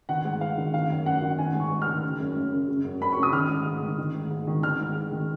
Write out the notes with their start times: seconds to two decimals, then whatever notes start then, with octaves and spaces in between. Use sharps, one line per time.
0.09 D#3 F#5
0.25 G#2
0.41 G#2 F5
0.58 D#3
0.74 D#3 F5
0.90 F#2
1.06 F#2 F#5
1.22 D#3
1.38 D#3 G#5
1.55 G#2
1.60 C#6
1.71 G#2
1.82 F6
1.87 D#3
2.03 C#3
2.20 F#2
2.36 F#2
2.52 C#3
2.68 C#3
2.84 F#2
3.01 F#2 B5
3.13 C#3 C#6
3.23 D#6
3.33 D#3 F6
3.49 G#2
3.66 G#2
3.82 D#3
3.98 D#3
4.14 G#2
4.31 G#2
4.47 D#3
4.63 D#3 F6
4.79 G#2
4.95 G#2
5.12 D#3